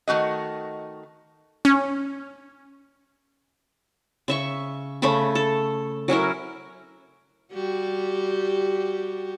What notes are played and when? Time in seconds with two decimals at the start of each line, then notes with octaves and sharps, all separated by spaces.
0.08 D#3 A3 F#4 D#5
1.65 C#4
4.28 C#3 E5 C#6
5.02 C#3 A3 E5 B5
5.35 A4
6.08 F#3 C#4 E4 A#4
7.53 G3 F#4 G4